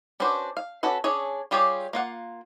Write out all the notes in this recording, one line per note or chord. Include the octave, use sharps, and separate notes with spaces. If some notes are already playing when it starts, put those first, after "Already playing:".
C#4 D4 F#4 B4 C5
F5
C#4 F#4 A4 B4
C#4 D4 G#4 C#5
G3 F4 G4 G#4 C#5
A#3 F4 F#5